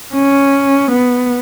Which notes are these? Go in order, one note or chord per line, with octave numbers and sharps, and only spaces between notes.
C#4
B3